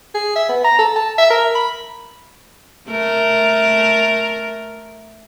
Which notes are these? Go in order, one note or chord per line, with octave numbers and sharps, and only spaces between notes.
G#4
E5
B3
A#5
A4
A5
E5
A#4
B5
A3 A#4